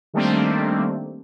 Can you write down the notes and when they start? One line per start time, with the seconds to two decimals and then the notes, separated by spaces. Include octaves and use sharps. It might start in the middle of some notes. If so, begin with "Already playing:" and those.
0.14 D#3 G3 A3 A#3 C4 D4